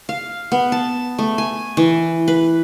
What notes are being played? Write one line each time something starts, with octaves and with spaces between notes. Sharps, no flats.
F5
B3
A5
A3
G#5
E3
B4